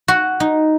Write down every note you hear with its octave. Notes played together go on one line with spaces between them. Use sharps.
F#4
D#4